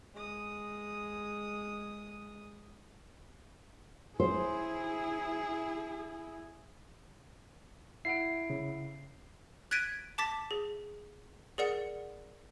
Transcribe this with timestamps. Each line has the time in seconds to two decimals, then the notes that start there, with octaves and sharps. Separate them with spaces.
0.14 G#3 D#6
4.20 E4 G#4 C5
8.05 E4 F#5 C7 D7
8.50 C#3
9.71 F#6 G#6 A6 B6 D7 D#7
10.18 A5 D6 A6 B6
10.51 G#4
11.58 G#4 A#4 D5 F#5 C#7